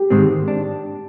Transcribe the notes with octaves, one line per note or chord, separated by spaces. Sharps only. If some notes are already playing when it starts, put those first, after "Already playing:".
Already playing: G4
G#2 D#3 G#3 C4
D4